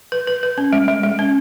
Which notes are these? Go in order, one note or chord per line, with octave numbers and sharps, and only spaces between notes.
B4
B4
B4
C#4
G#3
G#3
G#3
C#4